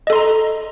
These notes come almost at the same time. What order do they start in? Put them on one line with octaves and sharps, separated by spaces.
D#5 A4 C6 A#5